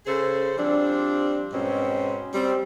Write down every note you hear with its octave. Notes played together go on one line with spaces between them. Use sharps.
C#3 G#4 A4 C5
F3 G3 C4 D4
G#2 B2 C4 C#4
G3 C4